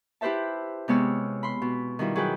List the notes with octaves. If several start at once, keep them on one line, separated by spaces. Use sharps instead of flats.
E4 G4 B4 C5 E5 A5
C3 G#3 B3 C#5 E6 F6
B5 C6
B2
D#3 G3 E4 F4
F#3 G#4 B4 G5